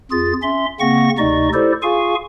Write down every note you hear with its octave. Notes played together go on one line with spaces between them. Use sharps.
F2 F4 G#4 A6
C#4 E5 C6
C#3 A#3 C4 F#5 C#6 A#6
D2 C3 D#4 D5 D#5 C#6
E4 G4 A4 C5 D5
F4 G#4 F5 G#5 C#6